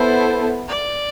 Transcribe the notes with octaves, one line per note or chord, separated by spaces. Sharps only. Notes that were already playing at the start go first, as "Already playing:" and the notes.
Already playing: B3 E4 A4 C5
D5